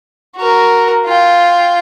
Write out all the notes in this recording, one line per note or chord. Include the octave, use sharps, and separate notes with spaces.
F#4 A#4
F4 G5